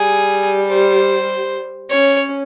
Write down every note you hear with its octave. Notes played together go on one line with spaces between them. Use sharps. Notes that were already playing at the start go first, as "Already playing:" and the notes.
Already playing: G3 G#4
C5
C#4 C#5